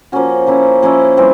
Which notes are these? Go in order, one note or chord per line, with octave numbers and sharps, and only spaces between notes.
F3 A#3 C#4 F#4
F3 A#3 C#4 E4
F3 A#3 C#4 E4
E3 G3 C4